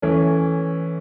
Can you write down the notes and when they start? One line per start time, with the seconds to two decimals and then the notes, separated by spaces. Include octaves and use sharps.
0.02 E3 A3 C#4